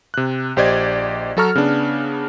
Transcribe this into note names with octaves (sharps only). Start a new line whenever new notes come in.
C3 F#6
A#1 G4 C5 D5 D#5 G#6
F#3 F#4 A4 A#5 C#6 F6
C#3 B3 D4